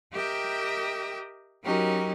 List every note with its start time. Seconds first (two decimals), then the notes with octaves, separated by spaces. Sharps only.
0.12 G4 A#4 D#5 E5 G5
1.63 F#3 C#4 D#4 F#4 G4 A#4